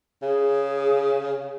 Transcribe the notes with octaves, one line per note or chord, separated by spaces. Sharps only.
C#3 G#4